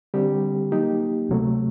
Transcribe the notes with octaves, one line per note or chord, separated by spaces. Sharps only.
D3 G3 C4 G4
F#3 A#3 D#4 G4
D2 C3 F#3 A3